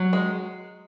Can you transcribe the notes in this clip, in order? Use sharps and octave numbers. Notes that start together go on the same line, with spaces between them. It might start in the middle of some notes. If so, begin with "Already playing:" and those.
Already playing: F#3
G#3